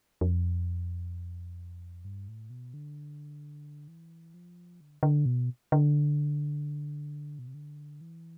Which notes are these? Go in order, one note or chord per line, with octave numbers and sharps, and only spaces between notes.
F2
G2
A2
B2
D3
E3
F3
D3
D3
B2
D3
B2
C3
D3
E3